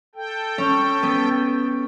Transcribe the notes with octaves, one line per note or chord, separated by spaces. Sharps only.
A4 G5
C#4
B3